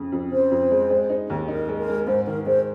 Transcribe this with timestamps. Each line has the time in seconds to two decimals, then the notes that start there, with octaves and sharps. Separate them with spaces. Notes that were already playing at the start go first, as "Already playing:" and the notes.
Already playing: F2 C#3
0.12 F2
0.31 C#3 C5
0.51 F2
0.71 G#3
0.90 G#3
1.09 D#4
1.30 D#2
1.48 D#4 A#4
1.68 G#3
1.78 A#4
1.88 G#3
2.07 G#2 C5
2.27 D#3 A#4
2.46 G#3 C5